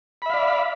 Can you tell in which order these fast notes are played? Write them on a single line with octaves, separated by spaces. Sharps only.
B5 E5 F5 D5